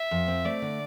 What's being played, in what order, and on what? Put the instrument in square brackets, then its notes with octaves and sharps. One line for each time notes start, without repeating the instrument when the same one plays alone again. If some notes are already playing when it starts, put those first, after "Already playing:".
Already playing: [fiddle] E5
[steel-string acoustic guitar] F2
C4
[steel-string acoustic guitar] A3 [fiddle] D5
[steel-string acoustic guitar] D3